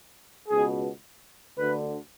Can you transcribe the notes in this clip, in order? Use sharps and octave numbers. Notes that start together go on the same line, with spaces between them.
C#2 B2 G#4
D2 D3 B4